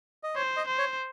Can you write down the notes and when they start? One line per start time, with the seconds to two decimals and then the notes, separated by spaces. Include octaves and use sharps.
0.23 D#5
0.36 C5 C#5
0.57 D#5
0.67 C5
0.78 C#5